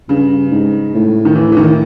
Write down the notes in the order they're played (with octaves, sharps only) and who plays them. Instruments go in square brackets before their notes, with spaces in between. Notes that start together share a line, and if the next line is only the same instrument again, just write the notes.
[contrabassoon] G2 [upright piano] C#3
[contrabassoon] G#2
A2
[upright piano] D#3
E3
E3
D#3